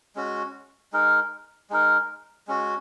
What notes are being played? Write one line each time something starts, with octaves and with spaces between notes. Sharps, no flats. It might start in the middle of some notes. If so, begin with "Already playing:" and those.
G#3 C#4 F#4
G#3 D#4 A#4
G#3 D#4 A#4
G#3 C#4 F#4